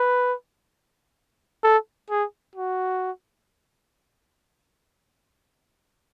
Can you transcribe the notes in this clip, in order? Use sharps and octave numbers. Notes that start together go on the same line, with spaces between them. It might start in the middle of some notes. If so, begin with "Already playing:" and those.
Already playing: B4
A4
G#4
F#4